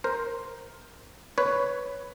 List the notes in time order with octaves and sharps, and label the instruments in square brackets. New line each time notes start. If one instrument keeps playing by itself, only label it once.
[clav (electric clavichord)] A#4 C5
B4 C#5